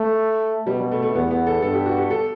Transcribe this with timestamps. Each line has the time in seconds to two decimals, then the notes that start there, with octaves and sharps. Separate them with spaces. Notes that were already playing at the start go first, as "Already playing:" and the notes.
Already playing: A3
0.67 B2 G3
0.80 G3
0.92 A3
1.02 A3
1.15 E2 B3
1.31 B3
1.47 A4
1.62 G2 A4
1.74 G4
1.86 F#4
1.98 G4
2.10 A4